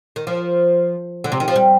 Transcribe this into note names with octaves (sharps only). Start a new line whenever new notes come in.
D#3
F3
D3
C3
D#3
F3
G3